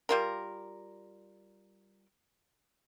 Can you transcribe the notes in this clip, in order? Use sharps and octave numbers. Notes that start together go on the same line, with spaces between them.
G3 F4 A#4